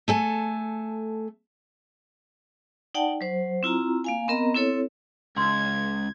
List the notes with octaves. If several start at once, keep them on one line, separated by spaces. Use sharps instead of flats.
A3 A4 G#5
D#4 D5 F#5 G5 A5
F#3 C5
C4 E4 F4 A#5
A#3 F5 G#5
B3 C4 A#4 D#5 A#5
C4 E4 A4 C#5
C#2 C6 G#6